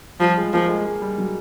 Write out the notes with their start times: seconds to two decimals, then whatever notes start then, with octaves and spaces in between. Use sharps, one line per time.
0.20 F3 G3
0.37 G#3
0.53 F3 A#3
0.69 G#3
0.86 G#3
1.02 G3
1.18 F#3